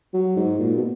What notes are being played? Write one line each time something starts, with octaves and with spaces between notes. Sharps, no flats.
F#3
G#2
A#2
B2